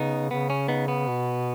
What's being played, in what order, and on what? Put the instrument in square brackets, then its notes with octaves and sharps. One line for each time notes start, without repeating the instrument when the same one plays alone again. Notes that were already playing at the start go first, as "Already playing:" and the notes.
Already playing: [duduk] C#3 [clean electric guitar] B3 D#4
[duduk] C#3 [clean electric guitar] B3
[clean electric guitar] C#4
B3 D#4
B3
[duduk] B2